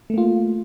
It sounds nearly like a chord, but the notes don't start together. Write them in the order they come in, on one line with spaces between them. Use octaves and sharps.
A3 A#3 F4